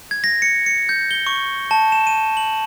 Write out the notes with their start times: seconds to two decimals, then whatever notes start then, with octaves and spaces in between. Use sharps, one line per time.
0.11 G#6
0.24 A#6
0.42 C#7
0.66 C#7
0.89 G6
1.11 G7
1.27 C#6
1.71 A5
1.92 E7
2.07 D#7
2.37 F#7